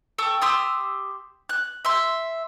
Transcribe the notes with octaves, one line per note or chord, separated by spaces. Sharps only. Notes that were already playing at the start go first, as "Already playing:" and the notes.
A4 G5 C#6
G4 C6 D#6 E6
F#6
E5 C6